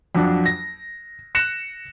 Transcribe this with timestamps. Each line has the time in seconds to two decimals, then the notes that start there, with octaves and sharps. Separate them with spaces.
0.15 F2 F#3 D4
0.46 A#6
1.35 F#6 A#6 C#7 E7